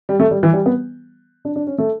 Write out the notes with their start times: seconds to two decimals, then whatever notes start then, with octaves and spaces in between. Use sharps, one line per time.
0.09 G3
0.20 A3
0.31 G3
0.43 E3
0.53 G3
0.66 B3
1.45 D4
1.56 D4
1.67 C#4
1.78 A3